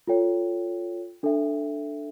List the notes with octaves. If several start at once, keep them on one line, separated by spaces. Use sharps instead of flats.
F4 A4 C#5 G5
D4 A4 E5 G5